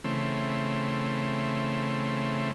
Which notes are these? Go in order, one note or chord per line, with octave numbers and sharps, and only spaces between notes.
C#3 E3 A3 C4